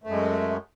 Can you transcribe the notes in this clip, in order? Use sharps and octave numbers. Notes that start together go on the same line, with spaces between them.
F#2 G#3 A3